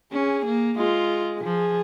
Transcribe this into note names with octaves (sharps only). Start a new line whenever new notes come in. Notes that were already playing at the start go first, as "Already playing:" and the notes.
C#4 G#4
A#3
G#3 F4
F3 G#4